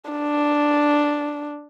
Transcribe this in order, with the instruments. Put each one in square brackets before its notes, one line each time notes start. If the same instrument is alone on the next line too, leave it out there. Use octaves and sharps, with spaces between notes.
[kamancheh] D4